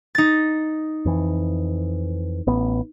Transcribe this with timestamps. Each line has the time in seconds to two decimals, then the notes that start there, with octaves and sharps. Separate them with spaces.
0.15 D#4 A6
1.05 F2 E3
2.47 A1 B3